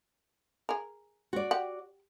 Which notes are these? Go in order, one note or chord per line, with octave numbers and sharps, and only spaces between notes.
G#4 A#4
F#4 D5
G4 F#5